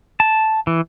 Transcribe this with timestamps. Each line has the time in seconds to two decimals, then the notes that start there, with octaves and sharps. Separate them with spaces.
0.20 A5
0.67 E3